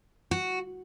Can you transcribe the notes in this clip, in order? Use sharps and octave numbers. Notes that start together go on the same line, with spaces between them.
F#4